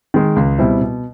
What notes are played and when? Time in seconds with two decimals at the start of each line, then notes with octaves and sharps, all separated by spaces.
0.14 D#3 G#3
0.36 C#2
0.58 B2 G3 C4 E4
0.80 B2